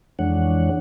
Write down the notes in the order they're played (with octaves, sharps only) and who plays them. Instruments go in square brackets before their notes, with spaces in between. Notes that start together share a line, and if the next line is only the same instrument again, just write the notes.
[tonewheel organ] F2 E3 G#3 D4 C#5 F#5